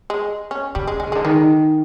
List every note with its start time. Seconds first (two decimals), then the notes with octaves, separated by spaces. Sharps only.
0.10 G#3
0.51 C#4
0.75 C#3 G3
0.87 G#3
1.00 D3 G#3
1.07 C#3
1.12 D3 G#3
1.24 D#3 G#3